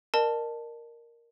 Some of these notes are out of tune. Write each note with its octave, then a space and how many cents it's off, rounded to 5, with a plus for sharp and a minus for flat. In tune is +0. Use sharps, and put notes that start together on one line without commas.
A#4 +0 D#5 -45 A5 +0